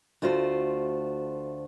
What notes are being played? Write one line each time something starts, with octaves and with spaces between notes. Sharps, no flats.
D2 A3 F4 F#4 C5